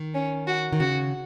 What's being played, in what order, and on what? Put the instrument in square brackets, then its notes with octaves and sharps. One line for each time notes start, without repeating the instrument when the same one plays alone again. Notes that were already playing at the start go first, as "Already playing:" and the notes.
Already playing: [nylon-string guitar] D#3
[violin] C#4
F#4
[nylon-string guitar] D#3
[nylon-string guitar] C#3 [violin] F#4